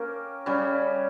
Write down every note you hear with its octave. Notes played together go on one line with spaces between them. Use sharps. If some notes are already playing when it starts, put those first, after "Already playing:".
Already playing: A#3 C#4 G4 A#4
C#3 G3 C#4